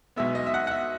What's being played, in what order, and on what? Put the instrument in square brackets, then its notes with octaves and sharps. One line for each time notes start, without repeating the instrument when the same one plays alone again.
[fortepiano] B1 B2 G#3 B3 E5
D#5
E5
F#5
F#5
E5